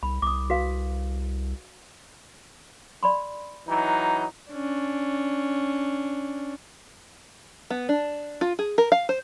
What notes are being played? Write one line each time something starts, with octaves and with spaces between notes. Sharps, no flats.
C2 B5
C2 D6 D#6
F#4 B4 F5
D5 B5 C6
E3 F#3 D#4
C#4 D4
B3
D4
F4
G#4
A#4
F5
C5